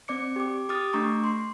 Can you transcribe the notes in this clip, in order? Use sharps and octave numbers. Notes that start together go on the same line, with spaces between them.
C4 D5 D6 C#7
G4 D6
G4 D6 D#6 F6 A6
A3 D4 A#5 C#6 D6
C6